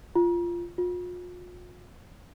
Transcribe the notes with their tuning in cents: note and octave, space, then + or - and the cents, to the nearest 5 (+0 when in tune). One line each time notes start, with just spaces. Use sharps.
F4 -15
F4 +40